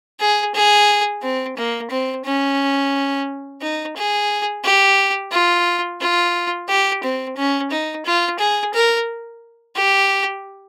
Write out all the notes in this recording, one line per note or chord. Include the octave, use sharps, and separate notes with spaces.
G#4
G#4
C4
A#3
C4
C#4
D#4
G#4
G4
F4
F4
G4
C4
C#4
D#4
F4
G#4
A#4
G4